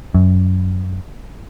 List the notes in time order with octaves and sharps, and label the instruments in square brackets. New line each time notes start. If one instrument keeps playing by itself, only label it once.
[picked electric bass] F#2